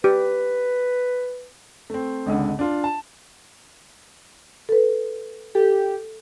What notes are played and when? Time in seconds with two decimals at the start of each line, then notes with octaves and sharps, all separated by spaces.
0.04 G4 B4
1.90 A3 C4
2.26 G#1 C#2 D3
2.59 D4 F4
2.84 A5
4.69 A4 B4
5.55 G4 A4